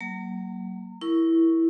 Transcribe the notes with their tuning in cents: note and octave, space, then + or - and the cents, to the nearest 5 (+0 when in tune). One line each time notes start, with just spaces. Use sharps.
F#3 +30 A#3 +0 A#5 -35
E4 +0 A#4 +0 C#6 +0